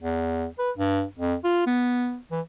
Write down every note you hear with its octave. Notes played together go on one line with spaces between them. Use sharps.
E2
B4
G2
F2
F4
B3
E3